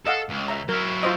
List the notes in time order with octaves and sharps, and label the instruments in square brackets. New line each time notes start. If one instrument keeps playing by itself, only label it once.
[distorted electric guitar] A4 [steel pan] D#5 F5 F#5
[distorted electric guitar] C#2
[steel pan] E5 A#5
[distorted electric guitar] F#3 E4 [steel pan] A#4
[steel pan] F4 C5 D#5